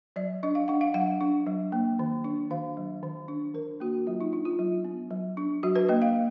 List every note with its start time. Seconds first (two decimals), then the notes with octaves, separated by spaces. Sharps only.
0.16 F#3 D5
0.43 D4 D#5
0.55 F5
0.68 D4 F#5
0.81 F5
0.94 F#3 F#5
1.21 D4
1.47 F#3
1.72 A#3
1.99 D#3
2.24 D4
2.50 D#3 F5
2.77 F#3
3.03 D#3
3.28 D4
3.54 D#3 A#4
3.80 A#3 F#4
4.07 F#3 F4
4.21 D#4
4.32 D4 D#4
4.45 F4
4.59 F#3
4.85 B3
5.10 F#3
5.37 D4
5.63 F#3 F#4
5.76 B4
5.89 A#3 D#5
6.02 F5